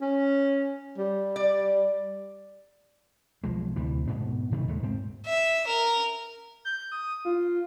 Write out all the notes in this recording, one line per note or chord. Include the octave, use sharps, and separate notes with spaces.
C#4
G3
D5
B1 F3 G#3
D2 C3 E3
G#2 B2 B3
C3 D#3 G3 A3
D#2 G#3 A3
G#2 C4
E5
A#4
G6
D#6
F4